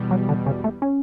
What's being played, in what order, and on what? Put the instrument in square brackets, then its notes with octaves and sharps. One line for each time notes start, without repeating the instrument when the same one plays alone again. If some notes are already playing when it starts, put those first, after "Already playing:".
Already playing: [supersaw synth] E2 B2 G3
[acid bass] F#3
D3
C#3
A3
C#4